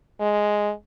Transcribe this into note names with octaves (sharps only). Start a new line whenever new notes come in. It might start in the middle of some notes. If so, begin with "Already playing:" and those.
G#3